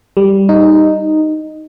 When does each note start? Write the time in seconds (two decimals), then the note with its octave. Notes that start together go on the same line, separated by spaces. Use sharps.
0.17 G3
0.49 D#4